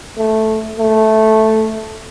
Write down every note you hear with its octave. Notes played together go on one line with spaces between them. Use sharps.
A3
A3